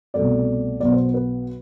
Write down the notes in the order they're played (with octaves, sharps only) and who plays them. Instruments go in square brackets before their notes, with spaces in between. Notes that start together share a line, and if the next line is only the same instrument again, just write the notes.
[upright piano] C2 B2 A3 D5
B1 B2 B3 D5
C5
B4